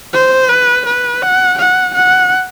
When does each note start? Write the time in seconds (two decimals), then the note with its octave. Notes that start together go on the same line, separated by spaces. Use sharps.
0.13 C5
0.49 B4
0.86 B4
1.22 F#5
1.58 F#5
1.95 F#5